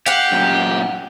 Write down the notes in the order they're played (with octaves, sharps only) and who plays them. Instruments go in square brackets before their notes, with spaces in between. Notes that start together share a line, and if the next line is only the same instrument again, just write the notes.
[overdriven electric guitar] G4 [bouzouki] F5 F#5
[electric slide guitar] F#2 A#2